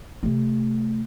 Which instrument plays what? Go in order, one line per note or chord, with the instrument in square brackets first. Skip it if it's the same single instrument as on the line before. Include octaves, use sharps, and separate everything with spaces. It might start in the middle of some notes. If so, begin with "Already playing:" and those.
[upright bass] C3 A3